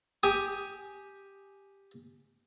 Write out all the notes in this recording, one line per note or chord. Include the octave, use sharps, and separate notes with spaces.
G4 G#5 D#6